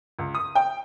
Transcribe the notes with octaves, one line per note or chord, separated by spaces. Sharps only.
C#2
D#6
G5